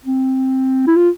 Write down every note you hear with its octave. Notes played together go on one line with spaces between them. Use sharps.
C4
E4
F4